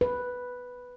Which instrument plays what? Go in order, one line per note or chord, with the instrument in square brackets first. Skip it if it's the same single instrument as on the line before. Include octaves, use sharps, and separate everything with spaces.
[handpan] B4